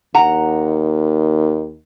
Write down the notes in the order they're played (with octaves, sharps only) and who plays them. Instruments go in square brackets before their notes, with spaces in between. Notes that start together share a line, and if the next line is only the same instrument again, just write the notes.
[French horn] D#2 [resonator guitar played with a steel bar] F#5 A#5